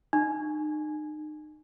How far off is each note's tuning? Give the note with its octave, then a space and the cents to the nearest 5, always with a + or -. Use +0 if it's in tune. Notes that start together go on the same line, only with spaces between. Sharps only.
D#4 -35